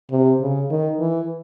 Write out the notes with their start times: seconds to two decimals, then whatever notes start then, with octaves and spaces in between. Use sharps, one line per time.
0.12 C3
0.41 C#3
0.70 D#3
1.00 E3